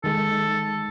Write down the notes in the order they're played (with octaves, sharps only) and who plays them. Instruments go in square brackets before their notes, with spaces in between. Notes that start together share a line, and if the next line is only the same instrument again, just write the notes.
[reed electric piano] D#3 G#3 [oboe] A4